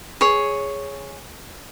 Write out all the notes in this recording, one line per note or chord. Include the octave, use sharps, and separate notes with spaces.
G#4 C#5